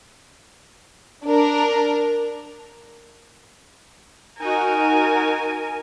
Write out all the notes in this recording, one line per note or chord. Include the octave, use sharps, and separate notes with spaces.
D4 A#4
D#4 F#4 A#4 G#5